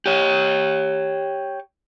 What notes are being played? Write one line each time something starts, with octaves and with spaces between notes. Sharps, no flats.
G4 C#5